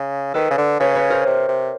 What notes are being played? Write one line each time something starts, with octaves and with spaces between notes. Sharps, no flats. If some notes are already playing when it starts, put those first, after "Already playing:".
Already playing: C#3
D#3 A4 B4
C#3
D3
C#3 B4 C#5
B4 C#5
A#4 C5
C3
C3